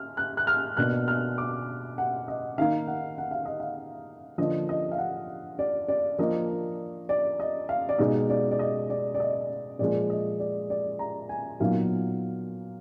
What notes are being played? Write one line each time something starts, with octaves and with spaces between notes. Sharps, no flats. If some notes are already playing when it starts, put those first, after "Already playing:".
Already playing: F6
F#6
F#6
F6
B2 A#3 D4 F#6
F6
D6
F#5
D#5
D#3 A#3 D#4 F5
F#5
F#5
F5
D#5
F5
D3 F3 A#3 D4 D#5
D#5
F5
F#5
D5
D5
F3 A#3 D4 D#5
D5
D#5
F5
D5
B2 G#3 D#4 D#5
D5
D5
D#5
D5
D5
D#5
A#2 F3 G#3 D5
D#5
D5
D5
A#5
G#5
A#2 F#3 B3 D#4 F5